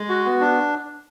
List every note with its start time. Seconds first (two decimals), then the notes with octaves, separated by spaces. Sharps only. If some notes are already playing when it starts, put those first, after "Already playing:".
Already playing: G#3
0.09 F#4
0.25 B3
0.40 D4